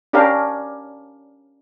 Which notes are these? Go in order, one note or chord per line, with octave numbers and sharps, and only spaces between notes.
C#4 D4 G4 A#4 F5